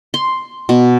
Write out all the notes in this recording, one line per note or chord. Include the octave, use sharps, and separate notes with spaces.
C6
B2